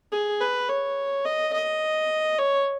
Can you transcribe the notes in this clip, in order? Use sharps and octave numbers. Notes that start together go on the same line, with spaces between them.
G#4
B4
C#5
D#5
D#5
C#5